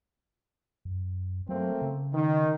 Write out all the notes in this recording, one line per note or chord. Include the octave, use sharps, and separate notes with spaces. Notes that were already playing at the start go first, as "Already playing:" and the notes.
F#2
F#3 A3 A#3 C4
C#3
D#3